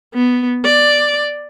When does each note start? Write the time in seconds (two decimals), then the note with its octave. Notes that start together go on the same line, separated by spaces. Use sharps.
0.14 B3
0.65 D5